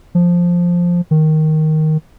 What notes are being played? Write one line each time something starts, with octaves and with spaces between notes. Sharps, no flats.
F3
D#3